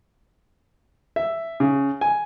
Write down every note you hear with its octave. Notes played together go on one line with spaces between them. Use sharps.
E5
C#3
G#5